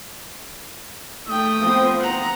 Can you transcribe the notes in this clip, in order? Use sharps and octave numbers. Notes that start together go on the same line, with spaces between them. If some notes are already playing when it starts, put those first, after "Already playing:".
A3 G5 D#6
F3 B3 C4
F#5 A#5